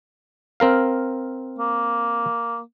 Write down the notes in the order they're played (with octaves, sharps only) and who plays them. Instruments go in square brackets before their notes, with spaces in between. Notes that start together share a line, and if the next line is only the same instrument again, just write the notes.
[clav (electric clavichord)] C4 A#4 F5
[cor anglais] A#3